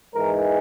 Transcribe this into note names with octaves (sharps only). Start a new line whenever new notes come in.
G#2 E3 G#3 A#4